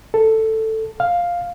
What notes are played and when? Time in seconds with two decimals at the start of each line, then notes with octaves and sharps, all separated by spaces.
0.14 A4
1.00 F5